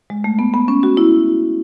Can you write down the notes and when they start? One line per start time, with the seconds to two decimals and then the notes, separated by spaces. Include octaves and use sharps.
0.10 G#3
0.24 A3
0.39 B3
0.54 B3
0.68 C#4
0.83 F#4
0.97 E4